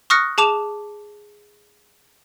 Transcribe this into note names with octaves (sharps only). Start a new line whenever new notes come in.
C#6 D#6 F6 F#6 A#6 C#7
G#4 A5 D6 E7 F7